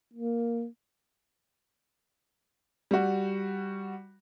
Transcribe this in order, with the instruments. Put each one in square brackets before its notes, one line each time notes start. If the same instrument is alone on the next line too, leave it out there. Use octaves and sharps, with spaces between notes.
[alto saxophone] A#3
[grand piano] G3 F#4